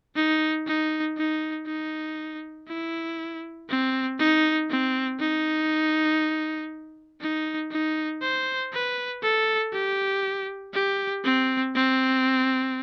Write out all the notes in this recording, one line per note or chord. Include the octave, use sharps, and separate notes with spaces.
D#4
D#4
D#4
D#4
E4
C4
D#4
C4
D#4
D#4
D#4
C5
B4
A4
G4
G4
C4
C4